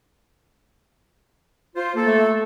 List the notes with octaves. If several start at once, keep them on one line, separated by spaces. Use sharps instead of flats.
F4 C5
A#3 A4
A3